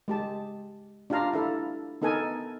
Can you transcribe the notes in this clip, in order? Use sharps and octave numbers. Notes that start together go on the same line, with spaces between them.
G#3 G4 A5
D4 F4 G4 F5 A#5
E4 A4
B3 D#4 A4 A#4 G#5